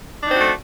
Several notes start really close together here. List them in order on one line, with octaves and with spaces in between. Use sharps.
D4 D#4 C4 F#4 A3